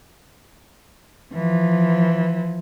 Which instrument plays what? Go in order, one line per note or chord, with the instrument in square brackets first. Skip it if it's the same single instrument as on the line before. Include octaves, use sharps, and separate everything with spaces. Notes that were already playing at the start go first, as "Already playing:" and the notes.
[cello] E3 F3